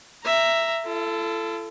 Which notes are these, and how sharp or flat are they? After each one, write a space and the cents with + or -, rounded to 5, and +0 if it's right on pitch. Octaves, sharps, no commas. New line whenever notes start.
E5 +10 A#5 +0
F4 -45 A4 +0